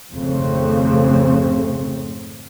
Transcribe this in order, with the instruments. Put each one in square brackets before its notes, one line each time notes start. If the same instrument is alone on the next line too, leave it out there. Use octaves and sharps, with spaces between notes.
[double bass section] G#1 F2 C#3 A3 C4